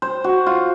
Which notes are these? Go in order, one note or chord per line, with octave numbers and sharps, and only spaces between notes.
C5
F#4
F4